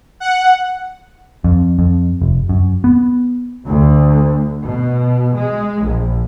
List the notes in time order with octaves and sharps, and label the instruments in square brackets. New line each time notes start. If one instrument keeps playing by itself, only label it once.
[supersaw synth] F#5
[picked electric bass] F2
F2
F1
F#2
B3
[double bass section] D2
B2
G#3
A#1